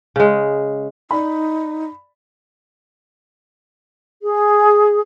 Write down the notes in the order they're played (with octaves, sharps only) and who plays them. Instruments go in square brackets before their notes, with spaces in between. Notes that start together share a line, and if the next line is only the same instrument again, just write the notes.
[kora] C#3 G#3
[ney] D#4 [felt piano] D5 B5
[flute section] G#4